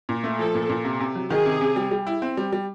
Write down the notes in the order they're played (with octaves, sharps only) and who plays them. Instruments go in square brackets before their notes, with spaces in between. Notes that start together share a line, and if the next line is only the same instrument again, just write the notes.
[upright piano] A#2
A3
[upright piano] F3 [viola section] A4
[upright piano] A#2
A#2
C3
C3
F#3
[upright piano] D#3 [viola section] G#4
[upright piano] C3
C3
G3
G3
E4
C4
G3
G3